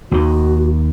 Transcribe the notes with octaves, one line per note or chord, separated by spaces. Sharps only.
D#2 D#3 F#4